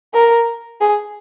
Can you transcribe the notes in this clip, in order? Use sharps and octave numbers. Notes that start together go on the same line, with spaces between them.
A#4
G#4